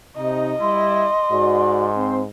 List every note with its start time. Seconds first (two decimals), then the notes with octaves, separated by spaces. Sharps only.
0.17 C3 D#4 D#5
0.60 G3 E4 C6
1.32 G#2 F#4 D5
1.96 C4 C5